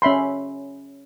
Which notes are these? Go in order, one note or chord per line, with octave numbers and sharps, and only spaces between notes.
C#4 E5 B5 C6